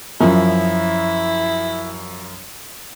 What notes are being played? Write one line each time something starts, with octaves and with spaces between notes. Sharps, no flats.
F#2 F3 E4